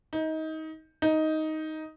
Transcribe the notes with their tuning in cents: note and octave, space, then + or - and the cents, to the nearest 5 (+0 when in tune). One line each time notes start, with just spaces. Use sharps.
D#4 +25
D#4 +10